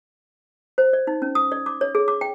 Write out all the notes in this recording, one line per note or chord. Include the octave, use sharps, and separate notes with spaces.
C5
D5
D#4
C#4
D#6
D5
D6
C#5
G#4
D6
G5